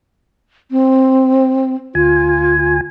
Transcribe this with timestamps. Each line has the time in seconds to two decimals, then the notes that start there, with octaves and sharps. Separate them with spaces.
0.71 C4
1.95 D2 F4 G#5